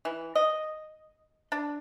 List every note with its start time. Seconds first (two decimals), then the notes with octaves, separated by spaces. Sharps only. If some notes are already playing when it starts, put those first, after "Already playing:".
0.05 E3
0.35 D#5
1.52 D4